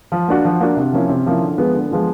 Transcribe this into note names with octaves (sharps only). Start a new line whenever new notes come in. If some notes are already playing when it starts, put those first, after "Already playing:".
F3
A#3 D4 F#4
F3
A#3 D4 F#4
C3
F3 A#3 C#4 E4
C3
F3 A#3 C#4 E4
D3
F3 G#3 B3
D3
F3 G#3 B3